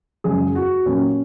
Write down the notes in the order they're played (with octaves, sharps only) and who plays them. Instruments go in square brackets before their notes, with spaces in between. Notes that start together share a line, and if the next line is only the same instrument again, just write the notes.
[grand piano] F#2 C#3 G#3 G#4
F#4
A#2 F#3 A#3 C#4